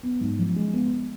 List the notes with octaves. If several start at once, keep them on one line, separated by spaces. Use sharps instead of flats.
B3
G#2
F3
G#3
B3